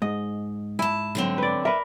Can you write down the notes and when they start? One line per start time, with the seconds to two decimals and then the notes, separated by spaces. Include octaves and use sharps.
0.02 G#2 D#5
0.79 E4 G#5 A5
1.15 D3 F#3 C4
1.38 B4 D5
1.65 A#4 B4 E5